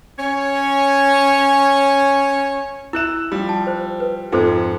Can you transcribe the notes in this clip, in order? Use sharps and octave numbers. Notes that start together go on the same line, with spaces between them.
C#4 C#5
E4 E5 E6 F#6 E7
F3 G3
A5
C5
B4
F2 G#2 F4 A4 C5